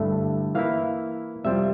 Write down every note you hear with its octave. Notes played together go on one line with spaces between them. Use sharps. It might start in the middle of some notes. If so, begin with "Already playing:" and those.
Already playing: G2 D3 A3 E4 E5
E3 A#3 E4 F5
F2 C3 G3 C4 F4 E5